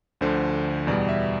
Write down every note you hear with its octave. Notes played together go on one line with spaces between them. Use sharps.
D2 D3 F3 C5
E2 B2 G3 D5
E5